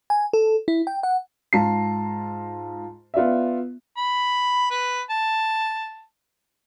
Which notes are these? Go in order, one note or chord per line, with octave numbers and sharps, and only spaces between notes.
G#5
A4
E4
G5
F#5
G#2 F4 A5 A#5 C7
B3 F4 D5 E5
B5
B4
A5